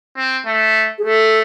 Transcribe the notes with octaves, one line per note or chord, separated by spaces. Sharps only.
C4
A3
G#4
A3 A4